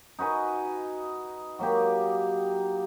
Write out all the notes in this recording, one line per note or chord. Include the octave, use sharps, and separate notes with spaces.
D#4 F#4 B4 G#5
F#3 A#3 G4